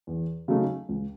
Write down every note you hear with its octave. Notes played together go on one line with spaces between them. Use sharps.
E2
C#3 F#3 A3 D#4
C#2